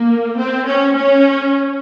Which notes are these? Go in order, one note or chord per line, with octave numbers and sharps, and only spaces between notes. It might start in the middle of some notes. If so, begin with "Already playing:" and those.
Already playing: A#3
C4
C#4
C#4